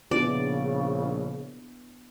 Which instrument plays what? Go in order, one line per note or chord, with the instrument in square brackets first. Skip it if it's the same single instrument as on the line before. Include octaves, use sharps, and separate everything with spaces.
[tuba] A#1 [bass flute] C#3 [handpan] B3 D4 E4 [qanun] D5